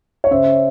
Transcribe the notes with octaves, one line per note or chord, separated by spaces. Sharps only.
C#5
C#3 C5 E5